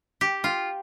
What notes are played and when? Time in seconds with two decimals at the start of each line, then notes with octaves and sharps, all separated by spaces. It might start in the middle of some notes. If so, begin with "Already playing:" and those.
0.21 G4
0.44 F4